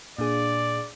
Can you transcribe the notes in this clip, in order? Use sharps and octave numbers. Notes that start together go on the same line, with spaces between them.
A#2 D4 G#4 D5